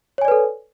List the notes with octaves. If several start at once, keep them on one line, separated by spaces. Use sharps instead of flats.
A4 B4 C#5 D5 G#5